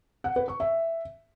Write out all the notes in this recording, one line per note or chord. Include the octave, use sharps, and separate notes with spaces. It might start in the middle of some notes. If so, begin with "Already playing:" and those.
F#5
B4
C#6
E5